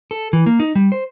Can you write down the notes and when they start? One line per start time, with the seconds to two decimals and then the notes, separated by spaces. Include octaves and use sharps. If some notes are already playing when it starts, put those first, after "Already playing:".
0.11 A4
0.33 E3
0.46 A#3
0.60 D#4
0.75 G3
0.92 C5